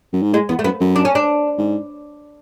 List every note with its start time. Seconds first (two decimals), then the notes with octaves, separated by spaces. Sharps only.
0.13 F#2
0.22 G#2
0.33 A2 G#3
0.49 E2 B3
0.59 A3
0.64 F#2 B3
0.80 F#2
0.96 D4
1.05 C#4
1.15 D4
1.58 G#2